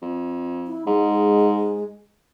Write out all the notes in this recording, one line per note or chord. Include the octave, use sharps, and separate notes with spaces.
F2
E4
G#2 G#3